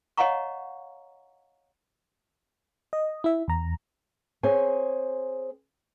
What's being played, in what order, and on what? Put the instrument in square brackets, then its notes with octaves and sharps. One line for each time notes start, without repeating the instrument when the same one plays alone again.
[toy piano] C#5 D#5 F5 F#5 A#5 C#6
[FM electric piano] D#5
E4 E5
E2 A#5
[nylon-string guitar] C4 G#4 C5 C#5 G#5